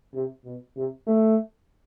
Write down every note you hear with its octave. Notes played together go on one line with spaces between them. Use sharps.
C3
B2
C3
A3